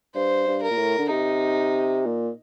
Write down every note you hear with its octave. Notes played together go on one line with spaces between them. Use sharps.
G2 C5
G2
A#4
A#2
A2
D3
C3 D#4
A#2